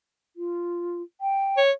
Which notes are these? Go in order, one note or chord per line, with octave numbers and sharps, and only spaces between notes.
F4
G5
C#5